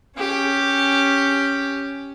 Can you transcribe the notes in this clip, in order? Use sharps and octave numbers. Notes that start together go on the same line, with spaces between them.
C#4 G4